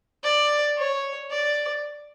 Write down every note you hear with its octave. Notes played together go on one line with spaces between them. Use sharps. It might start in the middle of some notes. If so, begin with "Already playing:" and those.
D5
C#5
D5